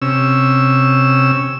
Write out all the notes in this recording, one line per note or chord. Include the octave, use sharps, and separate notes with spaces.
C3 C#4 E6